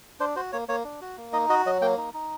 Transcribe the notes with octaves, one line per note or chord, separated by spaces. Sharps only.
D4 C5
F#4 C5
A#3 C#5
A#3 C#5
D4
F#4
A#3
D#4 D#5
F#4 D#5
F#3 D#5
A#3 G5
D#4
D#4